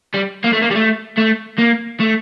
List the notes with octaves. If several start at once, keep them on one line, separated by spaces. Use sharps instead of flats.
G3
A#3
A3
A#3
G3
A3
A3
A#3
A3